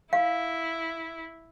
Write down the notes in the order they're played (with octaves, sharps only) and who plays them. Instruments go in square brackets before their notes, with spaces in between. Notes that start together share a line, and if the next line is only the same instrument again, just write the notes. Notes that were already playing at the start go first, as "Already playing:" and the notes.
[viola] E4 [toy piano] F5